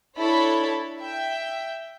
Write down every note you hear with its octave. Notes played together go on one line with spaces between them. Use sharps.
D4 E4 A4 C#5 B5
E5 G5